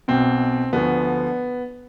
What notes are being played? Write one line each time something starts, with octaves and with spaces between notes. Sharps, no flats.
B1 B2 C4
D2 D3 F3 B3